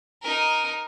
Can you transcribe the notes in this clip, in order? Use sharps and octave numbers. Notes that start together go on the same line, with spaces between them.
D#4 A#4